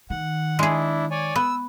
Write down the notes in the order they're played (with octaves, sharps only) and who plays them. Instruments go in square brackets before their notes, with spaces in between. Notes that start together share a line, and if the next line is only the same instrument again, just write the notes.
[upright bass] D#3 [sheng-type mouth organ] F#5
[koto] G#3 G#4 [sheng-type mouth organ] D4 E4
[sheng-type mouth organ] C#5 D5 G#5
[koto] B3 [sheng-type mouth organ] E6